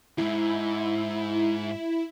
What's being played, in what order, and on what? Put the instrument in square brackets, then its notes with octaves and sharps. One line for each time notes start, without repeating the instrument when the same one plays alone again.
[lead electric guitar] E2 G#2 [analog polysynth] E4